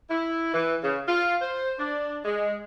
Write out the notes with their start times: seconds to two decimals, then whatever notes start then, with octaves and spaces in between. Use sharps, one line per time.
0.10 E4
0.54 E3
0.83 C#3
1.07 F4
1.41 C5
1.79 D4
2.25 G#3